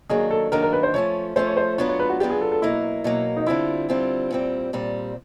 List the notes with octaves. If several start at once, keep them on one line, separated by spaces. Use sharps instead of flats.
D#3 F#3 A#3 D4 G#4
A4
D#3 F#3 A#3 D4 A#4
A#4
B4
C5
F3 A3 C#4 C#5
F3 A3 C#4 C5
C#5
C5
F#3 B3 D4 F4 C#5
C#5
B4
F#4
F#3 B3 D4 F4 G4
G#4
A4
A4
B2 F#3 A#3 E4
B2 F#3 A#3
D#4
D3 G3 C4 E4 F4
D3 G3 C4 F4
A#2 G3 C4
A#2 G3 C4